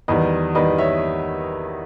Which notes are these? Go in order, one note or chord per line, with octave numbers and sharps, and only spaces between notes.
E2 D#3 G3 B4 D#5
E2 D#3 G3 B4 D#5
C#5 E5